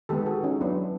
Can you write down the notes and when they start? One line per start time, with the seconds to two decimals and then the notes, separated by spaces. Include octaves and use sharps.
0.09 D#3 G#3 B3 G4 A4
0.26 F#4 G#4
0.43 C#4 D#4
0.60 F#3 B3 D4 E4